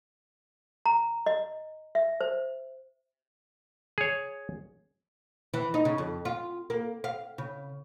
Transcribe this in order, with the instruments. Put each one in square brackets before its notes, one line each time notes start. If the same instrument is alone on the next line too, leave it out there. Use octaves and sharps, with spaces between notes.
[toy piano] A#5
D#5
E5
C5
[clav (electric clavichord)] G#4 C#5
[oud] E3
D#4
C#3
F2
F4
A#3
F5
C#3